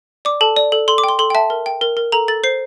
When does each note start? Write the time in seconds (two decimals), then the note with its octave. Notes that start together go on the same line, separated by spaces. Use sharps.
0.25 D5 D6
0.41 A4 A5
0.56 D5
0.72 A4
0.88 A4 C6
0.98 D6
1.04 G5
1.09 C6
1.19 A4 C6
1.30 G5
1.35 E5 A5
1.50 A#4
1.66 G5
1.81 A#4
1.97 A#4
2.12 A4 A#5
2.28 A4 A6
2.44 C5 C7